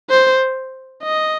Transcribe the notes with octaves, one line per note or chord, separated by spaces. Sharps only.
C5
D#5